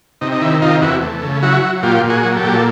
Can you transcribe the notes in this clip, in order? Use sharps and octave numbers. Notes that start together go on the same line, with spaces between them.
C3 D#4
D#4
D#3 E4
C3 D#4 F4
E2 E4 F#4
A3
C#3
F#3 E4 F#4
F#3
A#2 F4 G4
A#2
F#4 G#4
F#3
G4 A4
A#2
A4